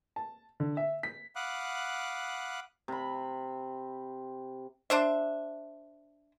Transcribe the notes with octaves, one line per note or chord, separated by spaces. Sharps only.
A5
D3
E5
B6
F5 F#5 B5 D6 D#6 F#6
C3 B5
D4 C5 E5